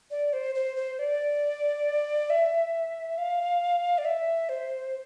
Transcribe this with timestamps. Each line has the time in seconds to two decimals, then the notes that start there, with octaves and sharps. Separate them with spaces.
0.11 D5
0.33 C5
0.55 C5
0.76 C5
0.99 D5
2.30 E5
3.18 F5
3.98 D5
4.05 E5
4.49 C5